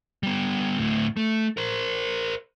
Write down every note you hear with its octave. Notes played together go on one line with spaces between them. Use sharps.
G3 B3
D2 A2
A3
A#4 C5